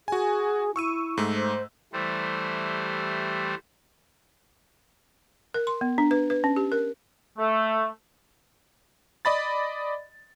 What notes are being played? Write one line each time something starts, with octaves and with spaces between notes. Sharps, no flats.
F#4 G#4 G#5
E4 C#6 E6 D#7
G#2 A3
C5
E3 G3 A3 C5
A#4
C6
B3
D4
B4
B4
C#4
G4
A#4
A3
D5 D#5 B5 A6